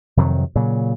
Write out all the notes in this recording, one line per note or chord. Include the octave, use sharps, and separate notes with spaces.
F2 C3 D#3 F#3
A#2 C#3 F#3